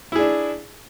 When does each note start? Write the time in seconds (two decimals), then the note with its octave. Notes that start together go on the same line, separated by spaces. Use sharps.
0.12 E4
0.16 G#4
0.19 D4